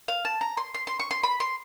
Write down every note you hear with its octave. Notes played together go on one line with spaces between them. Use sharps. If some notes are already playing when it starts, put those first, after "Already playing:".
F5
A5
A#5
C6
C6
C6
C#6
C6
B5
C6